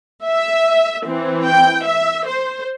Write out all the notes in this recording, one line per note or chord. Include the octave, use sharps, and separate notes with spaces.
E5
E3 C4
G5
E5
C5